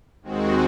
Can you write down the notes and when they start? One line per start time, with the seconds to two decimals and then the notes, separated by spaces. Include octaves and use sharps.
0.22 D#2 D#3 G#3 C4 F#4